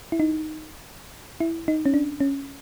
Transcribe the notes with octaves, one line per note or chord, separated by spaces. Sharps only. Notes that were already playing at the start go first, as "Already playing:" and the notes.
E4
D#4
E4
D#4
C#4
D4
C#4